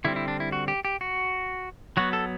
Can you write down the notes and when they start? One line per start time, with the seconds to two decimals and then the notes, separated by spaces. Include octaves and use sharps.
0.04 D3 G3 C4 E4
0.16 E4
0.28 D4
0.40 E4
0.52 F#4
0.68 G4
0.85 G4
1.01 F#4
1.97 F#3 B3 F#4
2.13 A4